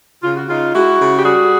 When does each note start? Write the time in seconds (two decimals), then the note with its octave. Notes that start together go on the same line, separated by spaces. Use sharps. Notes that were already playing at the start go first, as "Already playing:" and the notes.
0.23 C#3 F4
0.36 F#4
0.48 C#3 D#4 F4
0.74 G#3 E4 F#4
1.00 C#3
1.16 G4
1.24 G3 F#4 G#4